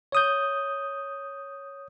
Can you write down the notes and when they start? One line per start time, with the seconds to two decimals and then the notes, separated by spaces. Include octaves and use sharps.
0.12 C#5 D#6 G6